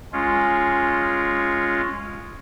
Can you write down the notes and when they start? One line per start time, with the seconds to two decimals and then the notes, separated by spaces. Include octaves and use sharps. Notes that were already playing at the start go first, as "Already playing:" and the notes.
0.13 G#3 C#4 F4